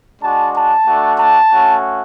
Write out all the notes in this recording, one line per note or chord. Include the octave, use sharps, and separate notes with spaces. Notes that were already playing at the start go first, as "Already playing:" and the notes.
G#3 D4 F#4 A5
A5
A3 D4 F#4
A5
A3 C#4 F#4